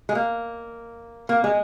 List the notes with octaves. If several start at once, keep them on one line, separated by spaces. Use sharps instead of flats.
G#3
A#3
A#3
G#3